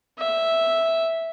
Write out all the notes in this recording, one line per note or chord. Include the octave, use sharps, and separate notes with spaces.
E5